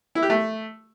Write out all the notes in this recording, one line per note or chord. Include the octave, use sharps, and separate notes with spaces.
E4
G4
A3